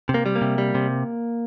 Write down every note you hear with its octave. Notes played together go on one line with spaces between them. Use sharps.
C3
A#3
G3
A#3
C3
G3
C3